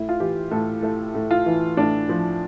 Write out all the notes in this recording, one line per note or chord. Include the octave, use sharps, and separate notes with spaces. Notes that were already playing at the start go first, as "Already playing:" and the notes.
Already playing: A2 E4
F4
E3 G4
A2 A4
A3 A4
A2
F4
E3
A2 D4
F3